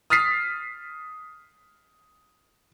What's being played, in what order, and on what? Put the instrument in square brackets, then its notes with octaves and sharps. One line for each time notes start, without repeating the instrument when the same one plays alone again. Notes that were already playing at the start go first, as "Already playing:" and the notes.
[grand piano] D#6 F6 A6 B6 C7